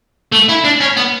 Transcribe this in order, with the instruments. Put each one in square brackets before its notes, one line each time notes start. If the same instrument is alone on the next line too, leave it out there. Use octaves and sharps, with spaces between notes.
[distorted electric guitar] A3
E4
D4
C#4
B3